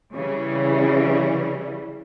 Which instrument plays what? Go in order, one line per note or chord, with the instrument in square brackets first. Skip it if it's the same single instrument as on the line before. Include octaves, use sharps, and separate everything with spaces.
[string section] C#3 E3 G3